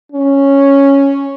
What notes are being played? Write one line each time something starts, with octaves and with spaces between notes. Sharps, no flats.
C#4